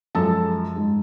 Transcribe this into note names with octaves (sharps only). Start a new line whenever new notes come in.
F#2 F3 G#3 A4 A5
G#2 G#3